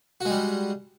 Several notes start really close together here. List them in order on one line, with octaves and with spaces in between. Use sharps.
F#4 G#3 G3